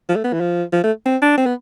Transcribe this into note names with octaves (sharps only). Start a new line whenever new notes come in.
F3
A3
B3
E3
F3
F3
A3
C4
D4
C4
B3